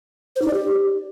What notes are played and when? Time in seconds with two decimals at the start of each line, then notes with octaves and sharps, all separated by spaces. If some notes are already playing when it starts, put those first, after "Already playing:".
0.36 C5
0.42 D#4
0.48 D5
0.54 G4